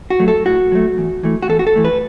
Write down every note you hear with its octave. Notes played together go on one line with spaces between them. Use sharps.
F#4
F#3 A3
A4
A2 F#4
F#3 A3
E2
E3 A3
F#4
E2 A4
F#4
A4
E3 A3
B4